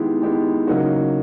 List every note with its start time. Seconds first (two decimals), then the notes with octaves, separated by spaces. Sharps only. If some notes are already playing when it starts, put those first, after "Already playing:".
Already playing: D#3 G#3 B3 E4 G4
0.22 D#3 G#3 B3 E4 G4
0.67 C#3 F#3 A#3 D#4 F#4